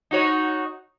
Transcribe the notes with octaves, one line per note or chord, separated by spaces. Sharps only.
D#4 F#4 C#5